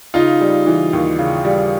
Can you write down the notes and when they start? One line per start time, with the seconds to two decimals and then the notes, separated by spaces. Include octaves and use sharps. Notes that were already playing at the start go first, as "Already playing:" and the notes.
0.14 C#3 D#4 F4
0.41 G3
0.67 E3
0.93 D#2
1.19 C#3
1.45 G3